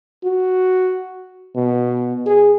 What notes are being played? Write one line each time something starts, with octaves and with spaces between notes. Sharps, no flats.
F#4
B2
G#4